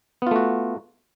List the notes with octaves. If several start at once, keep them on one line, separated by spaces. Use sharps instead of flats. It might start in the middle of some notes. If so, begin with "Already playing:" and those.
A3 B3 F4 F#4